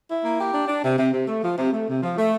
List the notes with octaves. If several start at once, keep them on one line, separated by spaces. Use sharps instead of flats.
E4
A#3
G4
D4
D4
C3
C3
C3
A3
F3
C3
A3
C3
F3
A3